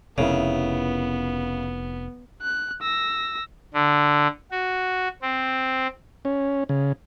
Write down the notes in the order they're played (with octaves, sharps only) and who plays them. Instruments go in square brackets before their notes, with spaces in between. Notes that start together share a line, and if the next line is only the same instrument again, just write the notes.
[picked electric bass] F1 [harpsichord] C#3 [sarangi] B3 [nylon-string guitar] E4 A#4 C#5
[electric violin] F#6
E6 A#6
[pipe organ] D3
F#4
C4
[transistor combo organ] C#4
C#3